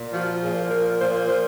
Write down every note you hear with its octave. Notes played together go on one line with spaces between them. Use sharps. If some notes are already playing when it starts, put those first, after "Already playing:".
Already playing: A#2
F3 F#4
A#2 G#4
F3 A#4
A#2 C5
F3 C5